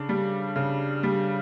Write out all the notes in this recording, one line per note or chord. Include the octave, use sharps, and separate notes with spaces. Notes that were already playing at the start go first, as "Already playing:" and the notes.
Already playing: C#3 D4
G3
C#3
G3